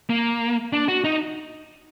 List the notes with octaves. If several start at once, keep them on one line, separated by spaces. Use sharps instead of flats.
A#3
D4
F#4
D#4